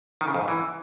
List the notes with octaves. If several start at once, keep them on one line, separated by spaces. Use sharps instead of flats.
D#3
C#3
F2
G#2
E3